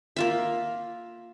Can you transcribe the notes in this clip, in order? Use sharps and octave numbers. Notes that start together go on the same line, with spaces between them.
A#3 F4 E5